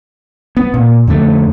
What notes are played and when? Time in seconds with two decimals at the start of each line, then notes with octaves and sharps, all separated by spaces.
0.57 B3
0.74 A#2
1.07 F2 D3 A3